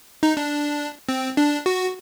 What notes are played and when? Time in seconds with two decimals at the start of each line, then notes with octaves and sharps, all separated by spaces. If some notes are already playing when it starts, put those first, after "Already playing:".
0.23 D#4
0.37 D4
1.09 C4
1.37 D4
1.66 F#4